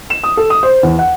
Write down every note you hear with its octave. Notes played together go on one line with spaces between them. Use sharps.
E7
D#6
A4
D#6
C5
E2
F#5